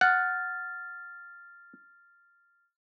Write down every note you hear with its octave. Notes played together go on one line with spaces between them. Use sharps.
F#5 F6 A6